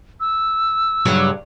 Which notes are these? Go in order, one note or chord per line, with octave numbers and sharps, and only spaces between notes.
E6
G2 C#3 F#3